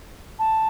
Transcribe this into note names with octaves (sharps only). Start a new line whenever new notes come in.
A5